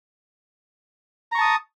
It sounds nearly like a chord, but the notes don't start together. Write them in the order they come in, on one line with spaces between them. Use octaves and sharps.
A#5 C#6 A5 D#6